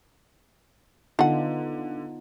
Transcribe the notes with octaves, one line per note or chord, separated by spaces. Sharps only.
D3 B3 D4 D#4 F4 F#5